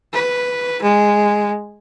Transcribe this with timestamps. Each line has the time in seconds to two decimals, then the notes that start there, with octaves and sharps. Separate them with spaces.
0.13 B4
0.83 G#3